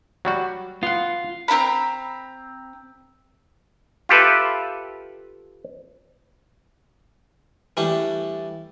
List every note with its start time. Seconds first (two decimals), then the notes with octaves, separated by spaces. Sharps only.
0.25 F#3 G3 F#4
0.83 B3 F4 F#5
1.48 C4 F4 A#5 B5
4.09 F4 G4 A4 B4 E5
7.77 E3 G3 A3 D4